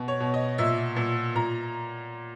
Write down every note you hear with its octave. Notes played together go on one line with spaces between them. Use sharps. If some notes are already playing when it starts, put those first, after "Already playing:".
Already playing: B2
C#5
B2
D#5
A#2 E5
A#2
A#2 A#5